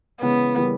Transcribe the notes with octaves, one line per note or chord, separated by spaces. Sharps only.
C#3 E3 G#3 B3 C#4 E4
C#3 E3 G3 A#3